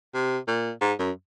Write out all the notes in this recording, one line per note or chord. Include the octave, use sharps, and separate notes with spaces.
C3
A#2
G#2
F#2